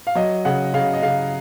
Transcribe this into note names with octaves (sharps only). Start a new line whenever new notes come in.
F5
F#3 D#5
C#3 F#5
C#3 F5
D#5
C#3 F5